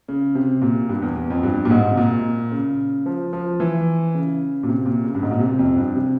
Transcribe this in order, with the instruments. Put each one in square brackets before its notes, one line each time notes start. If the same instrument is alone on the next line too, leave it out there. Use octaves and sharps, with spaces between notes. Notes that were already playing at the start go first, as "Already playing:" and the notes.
[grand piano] C#3
C3
A#2
G2
E2
E2
F2
G2
A#2
G#2
C3
A#2
C#3
F3
F3
E3
C#3
A#2
C3
A#2
C#3
G2
G#2
A#2
C3
F2
G2
C3